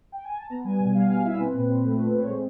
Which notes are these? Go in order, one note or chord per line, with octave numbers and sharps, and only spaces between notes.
G5
G#5
A5
B3 A#5
G3 G#5
B2
G3 F5
B2 F5
E4 E5
C4 B4
A#2
C4
A3
A#2
C4 C#5
G#3 C5